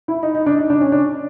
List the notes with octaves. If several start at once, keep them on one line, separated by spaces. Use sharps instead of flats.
E4
D#4
D#4
D4
D#4
D4
C#4
D4